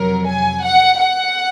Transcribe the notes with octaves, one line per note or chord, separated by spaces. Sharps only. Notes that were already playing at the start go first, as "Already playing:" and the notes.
Already playing: F2 C3 F#3 A#4
G#5
F#5
F#5